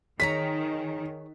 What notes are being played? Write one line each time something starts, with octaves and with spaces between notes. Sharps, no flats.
D#3 G#4 C#5 A#5 B6